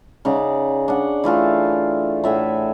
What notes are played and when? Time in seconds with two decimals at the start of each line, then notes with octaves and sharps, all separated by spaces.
0.25 C#3 D#4 D5 F#5
0.88 D4 F#5
1.24 E3 A3 F4 A4
2.24 A2 E5 F#5 G#5